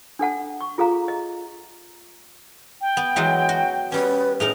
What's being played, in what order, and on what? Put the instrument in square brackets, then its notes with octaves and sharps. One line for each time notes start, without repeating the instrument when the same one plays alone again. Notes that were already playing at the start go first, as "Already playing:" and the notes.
[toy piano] D4 A4 F#5 A5
C#6
F4 G#4 A4 F5 A#5
D#5
[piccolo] G5
[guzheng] B3
E3 F#3 G#3
F#4
[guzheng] G3 C#4 [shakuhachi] B4
[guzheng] A2 D#4 A#4 [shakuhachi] G#4 [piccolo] F7